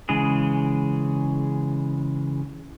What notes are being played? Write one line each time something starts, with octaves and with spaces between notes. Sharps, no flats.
C#3 E3 G#3 G#4